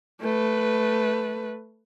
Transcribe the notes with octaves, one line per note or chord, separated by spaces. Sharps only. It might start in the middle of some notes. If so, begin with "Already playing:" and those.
A3 B4